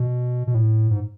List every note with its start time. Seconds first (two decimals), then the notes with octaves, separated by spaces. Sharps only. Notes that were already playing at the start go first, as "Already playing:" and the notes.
Already playing: B2
0.47 B2
0.54 A2
0.91 G#2